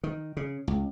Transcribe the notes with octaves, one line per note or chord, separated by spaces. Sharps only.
D#3
C#3
C#2